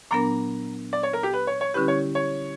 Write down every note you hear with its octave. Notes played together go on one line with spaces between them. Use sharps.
A#2 F#3 B3 D4 A#4 A#5
D5
C#5
A#4
G4
B4
C#5
C#5
D3 G3 C#4 E4 G4 B4
C#5
C#5